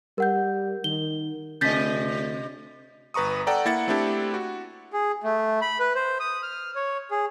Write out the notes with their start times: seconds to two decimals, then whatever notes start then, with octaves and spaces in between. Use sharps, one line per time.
0.18 G3 A#4 F#5 G6
0.84 D#3 G7
1.61 D2 C3 D#5 G6 A6 B6
3.14 G1 B4 A#5 C#6 D#6
3.47 A4 D5 F#5 G5 A#5
3.65 A#3 E4 F#5 A6 C#7
3.88 A3 C4 D4 E4 G4 A4
4.34 F#4
4.93 G#4
5.24 A3
5.62 B5
5.80 B4
5.95 C5
6.20 D#6
6.43 F6
6.76 C#5
7.11 G#4